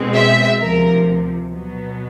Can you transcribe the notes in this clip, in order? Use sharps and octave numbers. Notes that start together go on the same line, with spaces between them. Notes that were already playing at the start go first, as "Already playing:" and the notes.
Already playing: B2 G#3 C4
E5
D2 C3 F3 A#4
B2 F#3 B3